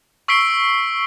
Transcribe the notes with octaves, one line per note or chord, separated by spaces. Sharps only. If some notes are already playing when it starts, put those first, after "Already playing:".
C#6 E6 B6 C7 D7 G7